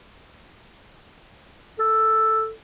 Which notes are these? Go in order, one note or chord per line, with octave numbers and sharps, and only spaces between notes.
A4